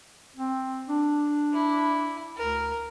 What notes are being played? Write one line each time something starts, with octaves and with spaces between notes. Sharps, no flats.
C4
D4
E4
D2 A#4